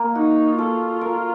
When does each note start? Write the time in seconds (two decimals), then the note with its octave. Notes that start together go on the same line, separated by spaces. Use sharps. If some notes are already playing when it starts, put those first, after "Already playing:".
Already playing: A#3
0.15 D#4 F#4
0.57 F4 A4
1.01 A#4